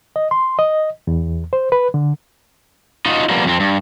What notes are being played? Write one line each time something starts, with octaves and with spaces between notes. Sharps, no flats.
D#5
C6
D#5
E2
C5
B4
D3
D#4 F4 F#4 D#5
F3 G3 A#3 B3
F2 C4
G2